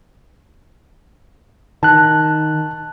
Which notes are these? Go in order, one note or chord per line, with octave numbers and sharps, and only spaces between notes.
D#3 A5 F#6